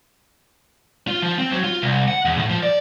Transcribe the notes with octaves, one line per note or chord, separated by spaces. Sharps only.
F4
F3
C4
F#3
F4
C2
F#5
E2
A2
F3
D5